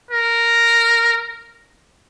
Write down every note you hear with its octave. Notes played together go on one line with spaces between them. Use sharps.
A#4